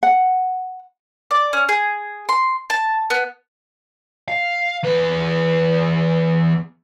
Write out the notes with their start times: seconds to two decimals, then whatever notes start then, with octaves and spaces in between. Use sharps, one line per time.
0.03 F#5
1.31 D5
1.53 C#4
1.69 G#4
2.29 C6
2.70 A5
3.10 B3
4.28 F5
4.84 E2 B4